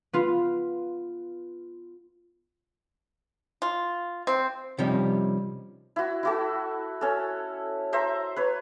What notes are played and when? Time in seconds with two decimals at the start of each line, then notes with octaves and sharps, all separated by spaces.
0.13 B3 F4
3.62 F4
4.27 C4
4.78 C3 F3 G3 C#4 D#4
5.96 E4 F#4
6.23 E4 F#4 A4
7.01 C#4 A4
7.93 C5 E5 A#5
8.36 B4 C#5